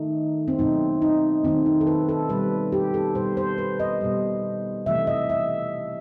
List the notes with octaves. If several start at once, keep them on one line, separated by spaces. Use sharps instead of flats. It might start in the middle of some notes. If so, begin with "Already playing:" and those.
Already playing: D#3 A3 D#4
C4
B2 F#3 A3 D#4
D#4
D#3 A3 C4
D#4
A4
B4
A4
B2 G3 B4
G4
A4
B2 G3 C5
C5
B4
D#5
B2 G3
C3 E3 A3 E5
D#5
E5